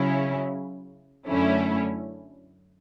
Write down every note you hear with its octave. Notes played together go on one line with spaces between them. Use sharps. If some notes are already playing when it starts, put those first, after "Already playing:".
Already playing: C#3 F#3 C#4 E4
F#2 D3 A3 C#4 E4